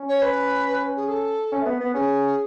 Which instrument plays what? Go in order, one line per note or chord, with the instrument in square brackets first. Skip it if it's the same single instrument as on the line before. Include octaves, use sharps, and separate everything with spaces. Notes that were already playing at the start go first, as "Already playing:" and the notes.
Already playing: [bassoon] C#4
[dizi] C#5
B4
G#4
A4
[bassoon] C#4
A3
B3
B3
[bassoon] C#4 [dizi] G#4